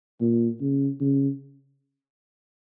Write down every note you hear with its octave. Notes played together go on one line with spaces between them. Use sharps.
A#2
C#3
C#3